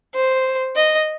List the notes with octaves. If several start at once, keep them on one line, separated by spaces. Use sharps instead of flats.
C5
D#5